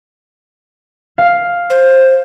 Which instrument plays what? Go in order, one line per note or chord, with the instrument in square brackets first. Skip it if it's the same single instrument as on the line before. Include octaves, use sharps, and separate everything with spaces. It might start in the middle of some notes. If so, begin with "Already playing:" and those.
[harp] F5
[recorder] C5